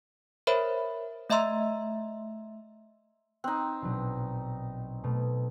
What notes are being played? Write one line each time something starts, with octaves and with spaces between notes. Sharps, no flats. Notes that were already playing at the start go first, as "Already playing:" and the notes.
A#4 C5 C#5 E5 B5
A3 D#5 E5 A#5 C6 E6
C4 D#4 F#6
A#1 B2 F#3
B2 A3